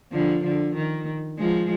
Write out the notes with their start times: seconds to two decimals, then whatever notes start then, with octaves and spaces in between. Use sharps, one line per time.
0.11 D3 F3
0.44 D3
0.75 D#3
1.38 F3 G#3